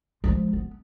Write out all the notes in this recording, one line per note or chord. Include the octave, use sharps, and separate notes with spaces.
F3 G#3
B3